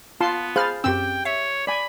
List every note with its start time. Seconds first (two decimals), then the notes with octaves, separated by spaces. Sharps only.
0.21 B3 F4 A5 C6
0.56 G#4 C5 F5 B5 F6 A6
0.84 F#2 C4 G4 G5 E6
1.25 C#5 E5
1.67 D5 G#5 B5